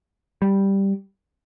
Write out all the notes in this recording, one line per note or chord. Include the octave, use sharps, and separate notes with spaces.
G3